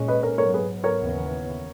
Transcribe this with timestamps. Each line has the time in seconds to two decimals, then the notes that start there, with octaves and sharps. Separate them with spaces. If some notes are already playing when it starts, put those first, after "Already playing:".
Already playing: A#2 G#3 C#4
0.08 B4 D#5
0.22 A#4 C#5
0.38 G#2 F#3 B3 A#4 C#5
0.54 G#4 B4
0.84 A#4 C#5
0.99 D#2 C#3 E3 B3